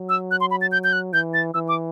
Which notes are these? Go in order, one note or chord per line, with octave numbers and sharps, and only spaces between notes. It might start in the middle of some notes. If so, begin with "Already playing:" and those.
Already playing: F#3
E6
F#6
C6
B5
A6
G6
G6
F#6
E3 G6
A6
E3 E6
D6